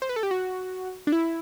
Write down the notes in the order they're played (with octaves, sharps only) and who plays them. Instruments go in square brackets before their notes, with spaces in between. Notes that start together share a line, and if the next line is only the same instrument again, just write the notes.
[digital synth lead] C5
B4
A4
G4
F#4
D4
E4